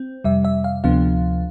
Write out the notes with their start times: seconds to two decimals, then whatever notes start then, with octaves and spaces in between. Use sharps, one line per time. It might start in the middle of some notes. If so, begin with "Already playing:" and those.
Already playing: C4
0.24 F2 C3 G3 E5
0.45 E5
0.64 F5
0.84 D2 C3 F3 B3 D4 F5